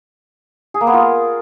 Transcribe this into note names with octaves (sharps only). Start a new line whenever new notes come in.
G#4
A#3
B3
F4
A#4